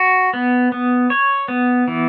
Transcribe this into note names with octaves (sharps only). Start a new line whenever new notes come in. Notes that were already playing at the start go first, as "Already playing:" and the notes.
Already playing: F#4
B3
B3
C#5
B3
E3